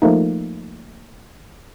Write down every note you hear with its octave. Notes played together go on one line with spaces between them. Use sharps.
F3 A3 A#3 D#4